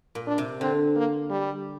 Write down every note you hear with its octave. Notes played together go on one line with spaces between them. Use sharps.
A#2
D4
C3
D3 C4
A#3
G3